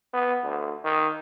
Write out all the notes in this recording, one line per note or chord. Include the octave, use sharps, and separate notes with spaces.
B3
D2
D#3